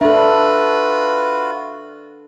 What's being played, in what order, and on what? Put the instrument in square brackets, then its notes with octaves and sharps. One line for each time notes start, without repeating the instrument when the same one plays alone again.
[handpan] D4 A4 [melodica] F4 F#4 [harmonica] B4 [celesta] E5